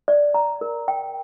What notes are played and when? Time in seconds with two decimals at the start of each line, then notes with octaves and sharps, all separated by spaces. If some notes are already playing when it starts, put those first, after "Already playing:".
0.08 D5
0.34 A#5
0.61 A#4
0.88 G5